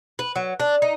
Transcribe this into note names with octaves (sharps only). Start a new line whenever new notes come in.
B4
F#3
D4
D#4